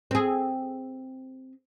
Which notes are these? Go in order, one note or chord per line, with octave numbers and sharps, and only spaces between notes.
C4 G#4